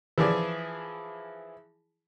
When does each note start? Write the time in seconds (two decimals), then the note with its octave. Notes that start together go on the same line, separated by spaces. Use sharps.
0.18 E3 F3 E4 G#4 D5